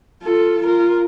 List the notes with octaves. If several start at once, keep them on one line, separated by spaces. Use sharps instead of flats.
F4 A4
F4 A#4